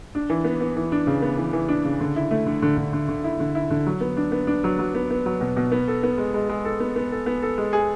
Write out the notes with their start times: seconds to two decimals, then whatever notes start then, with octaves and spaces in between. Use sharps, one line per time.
0.15 D4
0.30 E3
0.45 B3
0.61 B3
0.76 E3
0.92 D4
1.07 C#3
1.22 B3
1.38 E3
1.53 E3
1.68 D4
1.85 C#3
2.00 D3
2.16 E4
2.31 A3
2.46 D3
2.62 D3
2.77 D3
2.93 D3
3.08 D3
3.24 E4
3.40 D3
3.55 E4
3.70 D3
3.87 F#3
4.01 B3
4.17 D4
4.32 B3
4.47 D4
4.64 F#3
4.79 F#3
4.95 B3
5.10 B3
5.26 F#3
5.41 B2
5.57 B2
5.72 B3
5.88 A4
6.03 B3
6.18 G#3
6.34 G#3
6.49 G#3
6.65 A4
6.80 B3
6.96 B3
7.11 A4
7.26 B3
7.42 A4
7.58 G#3
7.73 G#4